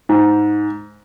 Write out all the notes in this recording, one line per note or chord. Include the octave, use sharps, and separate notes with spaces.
G#2